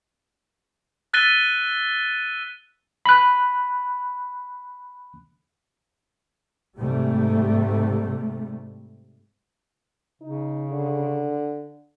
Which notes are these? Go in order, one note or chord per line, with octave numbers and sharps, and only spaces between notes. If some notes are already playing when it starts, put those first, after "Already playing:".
E6 F#6 A6 B6 D#7 G7
B5 F#6
G#2 C3 G3 A3
C#3 D#4
D3